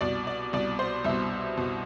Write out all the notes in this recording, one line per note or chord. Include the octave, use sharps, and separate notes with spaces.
C2 B2 D5
D5
C2 B2 D5
C5
C2 B2 E5
B2